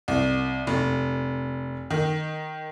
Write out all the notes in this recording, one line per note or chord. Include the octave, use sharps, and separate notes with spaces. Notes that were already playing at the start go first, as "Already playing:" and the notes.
C2
F1
D#3